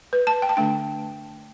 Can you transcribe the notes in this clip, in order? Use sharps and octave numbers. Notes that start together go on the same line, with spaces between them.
B4
A5
G5
A5
D3 A3 D4 G5